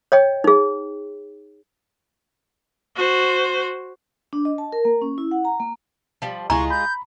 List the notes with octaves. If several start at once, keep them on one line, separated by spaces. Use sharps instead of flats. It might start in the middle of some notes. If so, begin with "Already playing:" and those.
C#5 D#5 G5
D#4 G#4
F#4 C5
D4
D#5
A5
A#4
A#3
C#4
E4
F#5
A#5
A#3
F3 G3
C#2 G#3 E4 F4 G#4 A#5 C#6
B5 G6